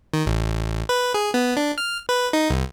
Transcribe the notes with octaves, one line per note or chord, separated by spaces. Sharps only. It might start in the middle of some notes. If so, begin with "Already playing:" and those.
D#3
A1
B4
G#4
B3
D4
F6
B4
D#4
C2